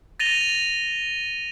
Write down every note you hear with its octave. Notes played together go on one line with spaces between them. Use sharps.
A6 A#6 D#7 F7 G7